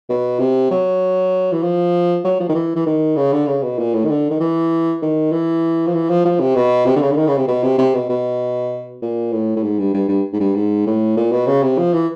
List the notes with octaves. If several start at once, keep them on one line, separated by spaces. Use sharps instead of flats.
B2
C3
F#3
E3
F3
F#3
F3
D#3
E3
E3
D#3
C#3
D3
C#3
B2
A#2
A2
D#3
D3
D#3
E3
D#3
E3
F3
E3
F3
F3
C3
B2
C3
D3
C#3
D3
D#3
C#3
C3
B2
C3
C3
B2
B2
A#2
A2
A2
G#2
G2
G2
G2
G#2
G2
G#2
A2
A#2
B2
C#3
C3
F3
E3